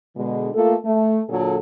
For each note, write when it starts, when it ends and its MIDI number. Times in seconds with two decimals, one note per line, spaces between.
0.16 0.48 47
0.16 0.48 50
0.16 0.48 56
0.54 0.74 57
0.54 0.74 58
0.54 0.74 65
0.54 0.74 69
0.85 1.20 57
1.28 1.56 46
1.28 1.56 50
1.28 1.56 54
1.28 1.56 68
1.28 1.56 69